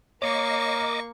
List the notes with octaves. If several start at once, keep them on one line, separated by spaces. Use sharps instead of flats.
A#3 A#4 C#5 D#5 C#6 D6